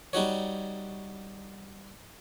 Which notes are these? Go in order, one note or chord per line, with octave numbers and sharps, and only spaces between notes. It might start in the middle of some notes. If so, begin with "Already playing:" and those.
G3 D#4 F#4 C#5